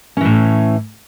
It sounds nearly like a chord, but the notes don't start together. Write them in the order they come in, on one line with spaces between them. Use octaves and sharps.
C#4 E3 A2